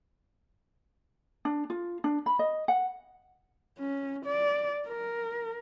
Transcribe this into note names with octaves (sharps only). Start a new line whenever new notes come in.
D4
F4
D4
B5
D#5
F#5
C#4
D5
A#4